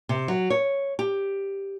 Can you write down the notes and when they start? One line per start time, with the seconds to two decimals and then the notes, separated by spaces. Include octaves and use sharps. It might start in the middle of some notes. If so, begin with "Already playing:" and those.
0.09 C3
0.28 F#3
0.50 C#5
0.99 G4